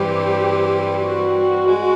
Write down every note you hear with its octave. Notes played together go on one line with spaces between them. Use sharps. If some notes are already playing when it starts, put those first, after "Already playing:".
Already playing: G2 E3 G3 C4 G4
F#4
G#3